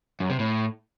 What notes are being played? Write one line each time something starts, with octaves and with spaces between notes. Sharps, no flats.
F#2
C3
A2